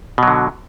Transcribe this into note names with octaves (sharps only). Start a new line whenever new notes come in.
B2 D3 F#3